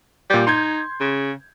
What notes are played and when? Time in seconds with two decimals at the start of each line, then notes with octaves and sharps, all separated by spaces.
0.30 A#2 G3 G6
0.47 D#4 C6 G6 G#6
1.00 C#3